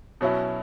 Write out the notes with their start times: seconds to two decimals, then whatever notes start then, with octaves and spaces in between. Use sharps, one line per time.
0.21 B2 F#3 C#4 E4